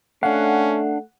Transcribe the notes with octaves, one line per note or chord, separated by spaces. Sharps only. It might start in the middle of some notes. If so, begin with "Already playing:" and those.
A3 C#4 D4 F5 F#5